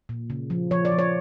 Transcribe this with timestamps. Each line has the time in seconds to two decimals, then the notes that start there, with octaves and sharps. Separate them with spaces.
0.09 A#2
0.30 C#3
0.50 F3
0.71 F3 C#5
0.85 D5
0.92 F3
0.99 C#5